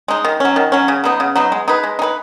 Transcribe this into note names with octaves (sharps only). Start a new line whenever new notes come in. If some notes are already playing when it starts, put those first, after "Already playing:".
G#3 D#4
D#3
F#3 C#4
D#3
F#3 C#4
C#3
F#3 B3 D#4
C#3
F#3 B3 D#4
G#3
D#4 G#4 B4
G#3
D#4 G#4 B4